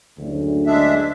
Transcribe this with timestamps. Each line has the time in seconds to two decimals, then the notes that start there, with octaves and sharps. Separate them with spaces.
0.19 F#1 D2
0.67 G#3 D4 E5